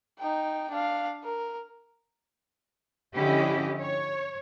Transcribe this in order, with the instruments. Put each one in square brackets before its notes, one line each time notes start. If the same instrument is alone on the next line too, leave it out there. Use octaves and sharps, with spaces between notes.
[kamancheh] D#4 G5
D4 F5
A#4
[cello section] D3 F3 C#4 E4 G4 D#5
C#5